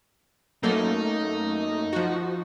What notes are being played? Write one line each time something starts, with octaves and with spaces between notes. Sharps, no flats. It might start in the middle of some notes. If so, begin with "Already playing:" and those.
F#2 A3 A#3 D#4
F3 F#4